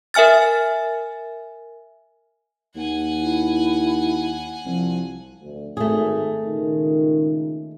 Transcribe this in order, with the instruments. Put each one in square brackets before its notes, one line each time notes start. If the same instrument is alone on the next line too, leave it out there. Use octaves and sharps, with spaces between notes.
[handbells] A#4 E5 G#5 F6 A6
[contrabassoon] D#2 [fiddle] F#5 G#5
[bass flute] E4
[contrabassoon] C2 [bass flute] F3
[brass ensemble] D2
[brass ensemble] G#1 [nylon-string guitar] A3 G#4
[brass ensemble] C#2 A#2 D#3